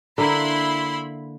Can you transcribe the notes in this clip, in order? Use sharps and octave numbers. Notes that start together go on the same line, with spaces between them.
D3 A#3 E4 B5 C6